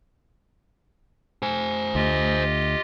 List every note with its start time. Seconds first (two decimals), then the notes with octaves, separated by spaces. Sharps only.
1.43 C5 G#5
1.95 D2 F4 G4 D#5